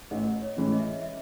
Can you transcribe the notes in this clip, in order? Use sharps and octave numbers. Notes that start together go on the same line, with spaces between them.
A1 D#5
C#5
A2 E3 G#3 C#4
D#5
E5
D#5
E5